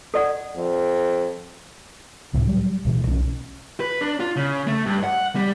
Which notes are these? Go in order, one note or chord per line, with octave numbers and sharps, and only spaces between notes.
A4 D5 F#5
F2
C#2 A2 C3
F#3 G3
D1 B2 E3
B1 G#3 C#4
B4
D4
F4
C#3
A3
G2
F#5
G3